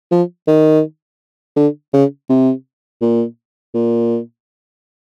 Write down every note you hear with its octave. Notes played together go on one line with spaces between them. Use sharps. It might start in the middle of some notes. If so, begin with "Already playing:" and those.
F3
D#3
D3
C#3
C3
A#2
A#2